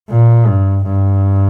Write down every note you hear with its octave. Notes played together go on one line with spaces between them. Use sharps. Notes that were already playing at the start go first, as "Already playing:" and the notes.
A#2
G2
G2